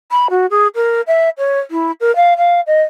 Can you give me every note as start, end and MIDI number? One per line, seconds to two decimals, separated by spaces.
0.11 0.27 83
0.30 0.46 66
0.50 0.67 68
0.75 1.01 70
1.07 1.29 76
1.38 1.59 73
1.71 1.91 64
2.00 2.14 70
2.16 2.34 77
2.37 2.60 77
2.66 2.81 75